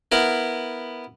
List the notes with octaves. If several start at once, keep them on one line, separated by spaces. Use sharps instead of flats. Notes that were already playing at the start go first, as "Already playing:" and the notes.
B3 E4 A#4